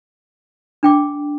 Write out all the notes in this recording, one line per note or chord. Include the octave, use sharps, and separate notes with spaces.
D4 G5 D6